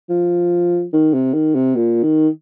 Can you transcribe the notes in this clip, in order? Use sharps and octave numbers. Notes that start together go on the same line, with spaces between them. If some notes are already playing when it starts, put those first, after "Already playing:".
F3
D#3
C3
D#3
C3
A#2
D#3